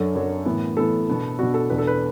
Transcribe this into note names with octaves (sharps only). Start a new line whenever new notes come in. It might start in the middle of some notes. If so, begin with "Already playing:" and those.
Already playing: F#2 F#3 D4 A4
F#2 F#3 D4
A2 E3 B3
A2 E3 B3 A4
B2 B3 D4
B2 B3 D4 F#4
A4
E2 B2 B3 D4 B4
A4
B4